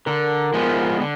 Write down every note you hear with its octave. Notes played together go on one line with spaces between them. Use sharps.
D3 A#4
F3 G#3 B3
D3